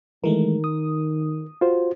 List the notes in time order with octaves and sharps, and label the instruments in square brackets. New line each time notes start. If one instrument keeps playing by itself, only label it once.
[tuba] D#3 [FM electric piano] E3 G#3 A3 [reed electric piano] A#4
[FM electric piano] D#6
[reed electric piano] F4 F#4 C5